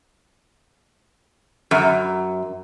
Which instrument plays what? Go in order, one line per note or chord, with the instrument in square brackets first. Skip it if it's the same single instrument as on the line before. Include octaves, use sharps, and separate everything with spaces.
[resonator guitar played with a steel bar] F#2